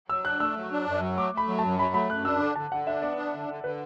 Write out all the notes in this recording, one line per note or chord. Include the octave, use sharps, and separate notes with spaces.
F#3 E6
D4 F#6
A3 E6
F#3
D4
F#2
F#3
A3 D6
A3 B5
F#3
A5
F#2
F#3 B5
A3 B5
F#2 F#6
D4 E6
D3 D6
D3 A5
D3 F#5
D4 E5
B3 D5
D4
D3
D3
D3 B4